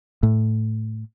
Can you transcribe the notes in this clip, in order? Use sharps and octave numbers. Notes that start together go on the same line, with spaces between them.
A2